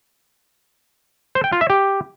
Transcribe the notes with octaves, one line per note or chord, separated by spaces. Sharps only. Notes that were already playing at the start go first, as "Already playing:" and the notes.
C5
G5
F4
E5
G4